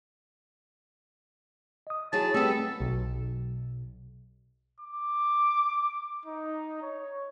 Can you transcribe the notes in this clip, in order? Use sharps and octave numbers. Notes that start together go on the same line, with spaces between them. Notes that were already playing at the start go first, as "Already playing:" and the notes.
D#5 D#6
F#3 E4 G#4 A5
G3 A3 B3 C4 G4 A4
B1
D6
D#4
C#5